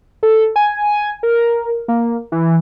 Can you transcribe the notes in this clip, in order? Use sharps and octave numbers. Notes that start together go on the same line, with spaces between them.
A4
G#5
A#4
A#3
E3